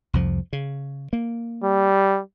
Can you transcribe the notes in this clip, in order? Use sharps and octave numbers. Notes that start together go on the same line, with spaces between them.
C2 F2 F3
C#3
A#3
G3